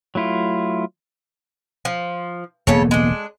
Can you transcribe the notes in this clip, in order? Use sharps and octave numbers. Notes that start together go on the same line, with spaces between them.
F#3 A3 E4 F4
F3
E1 C#3 A#3 B3 A4 C#5
G#3 D4